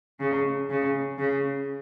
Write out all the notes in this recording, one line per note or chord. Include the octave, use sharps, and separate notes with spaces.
C#3
C#3
C#3